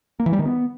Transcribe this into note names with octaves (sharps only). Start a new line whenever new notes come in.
A#3
E3
G3
D#3
B3